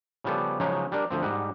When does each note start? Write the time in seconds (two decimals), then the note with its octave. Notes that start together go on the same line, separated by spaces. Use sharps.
0.24 C#3 F3 G3 B3 A4
0.60 C#3 F3 F#3 G#3 C#4 D#4
0.92 G3 D4 A#4 D5
1.10 D2 F3 C4
1.23 G#2 G3 D#5 F#5